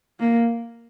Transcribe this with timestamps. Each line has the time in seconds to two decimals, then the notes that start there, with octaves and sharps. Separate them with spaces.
0.20 A#3